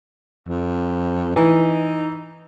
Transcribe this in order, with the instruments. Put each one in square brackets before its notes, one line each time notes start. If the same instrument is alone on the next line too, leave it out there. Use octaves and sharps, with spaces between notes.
[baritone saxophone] F2
[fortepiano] E3 [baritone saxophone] D#4